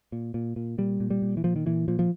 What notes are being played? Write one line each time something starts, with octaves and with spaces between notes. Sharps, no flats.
A#2
A#2
A#2
A#2 G3
A#2
G3
A#2
E3
A#2 F3
D#3
A#2 E3
A#2 F3
F3